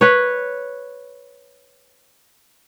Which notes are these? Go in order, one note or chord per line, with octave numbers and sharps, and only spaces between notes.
B4 C#5